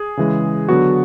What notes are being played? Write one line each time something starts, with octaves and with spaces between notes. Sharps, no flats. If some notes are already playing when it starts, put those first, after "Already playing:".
Already playing: G#4
C#3 E3 G#3
D3 F#3 B3 F#4